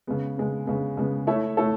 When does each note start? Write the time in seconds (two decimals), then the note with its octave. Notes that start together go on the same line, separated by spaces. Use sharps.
0.07 C#3 G#3 B3
0.37 C#3 G#3 B3
0.67 C#3 G#3 B3
0.97 C#3 G#3 B3
1.27 A3 E4 A4 C#5 E5
1.57 A3 E4 A4 C#5 E5